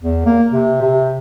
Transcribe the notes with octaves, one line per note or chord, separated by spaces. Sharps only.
E2
A#3
C3
C3